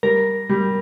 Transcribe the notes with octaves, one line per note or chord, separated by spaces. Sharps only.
G3 A#4
G3